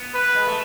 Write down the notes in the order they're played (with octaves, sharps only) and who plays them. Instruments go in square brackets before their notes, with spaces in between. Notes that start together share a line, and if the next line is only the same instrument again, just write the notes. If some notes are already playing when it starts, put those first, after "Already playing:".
Already playing: [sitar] B3
[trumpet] B4
[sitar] G#3
A3